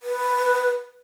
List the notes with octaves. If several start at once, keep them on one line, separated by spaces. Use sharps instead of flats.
B4